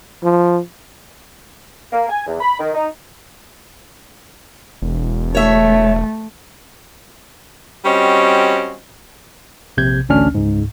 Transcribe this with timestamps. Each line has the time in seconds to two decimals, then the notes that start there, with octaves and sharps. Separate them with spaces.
0.24 F3
1.93 A#3
2.09 G#5
2.27 E2
2.41 B5
2.59 D#3
2.75 D#4
4.82 E1
5.35 A3 C#5 E5
7.85 G3 C4 C#4 F#4 C5 D#5
9.77 A#1 C3 G6 G#6
10.09 A1 D2 C#4 D4 F6
10.35 C#2 G#2